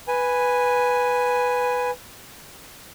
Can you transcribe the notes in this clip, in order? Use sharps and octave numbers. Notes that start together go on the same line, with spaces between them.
B4 G#5